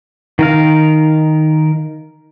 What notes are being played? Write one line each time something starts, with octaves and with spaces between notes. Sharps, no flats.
D#3 A#4 F5